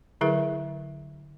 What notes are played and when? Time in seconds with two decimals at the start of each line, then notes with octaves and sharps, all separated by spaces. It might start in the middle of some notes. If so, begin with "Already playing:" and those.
0.21 D3 F#3 E4 G#4 A#4 E5